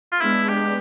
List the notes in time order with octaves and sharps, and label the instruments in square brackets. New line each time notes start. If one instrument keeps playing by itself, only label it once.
[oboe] F4
[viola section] G#3 B3 D4 [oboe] E4
[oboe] G4